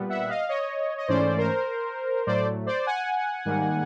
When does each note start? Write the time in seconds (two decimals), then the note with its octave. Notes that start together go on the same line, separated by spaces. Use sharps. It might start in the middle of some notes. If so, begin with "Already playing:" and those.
Already playing: A#2 G3 B3
0.09 E5 F#5
0.29 D#5 F5
0.49 C#5 D#5
0.98 D#5
1.08 G#2 E3 A3 C#4 C5 D5
1.38 A#4 C5
2.27 A2 F#3 A3 C5 D5
2.66 C5 D5
2.86 F#5 G#5
3.45 G#2 D#3 G3 A#3